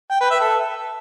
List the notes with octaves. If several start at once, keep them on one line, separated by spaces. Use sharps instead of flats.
G5
B4
E5
A4